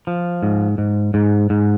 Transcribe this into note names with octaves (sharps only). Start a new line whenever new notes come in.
F3
G#2
G#2
G#2
G#2